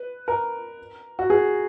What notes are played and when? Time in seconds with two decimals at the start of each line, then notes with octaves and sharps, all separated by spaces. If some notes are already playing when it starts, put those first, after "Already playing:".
Already playing: B4
0.28 A#4
1.19 F#4
1.30 G#4